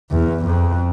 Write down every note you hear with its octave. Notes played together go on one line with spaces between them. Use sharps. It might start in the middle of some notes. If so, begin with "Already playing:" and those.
E2
F2